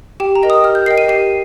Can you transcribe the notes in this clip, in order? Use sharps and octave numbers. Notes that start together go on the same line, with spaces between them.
G4 G5
A#5
A#4 D#5 G5
D#6
G4 F6
G6
A#4 D#5 G5 C7
D#7
G4 C7